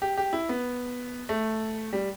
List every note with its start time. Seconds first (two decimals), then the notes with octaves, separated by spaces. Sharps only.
0.02 G4
0.17 G4
0.33 E4
0.49 B3
1.29 A3
1.93 G3